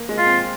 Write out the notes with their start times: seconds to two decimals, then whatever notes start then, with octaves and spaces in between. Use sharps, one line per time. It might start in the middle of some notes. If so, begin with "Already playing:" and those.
Already playing: A#3
0.09 G#3
0.18 F4
0.26 C4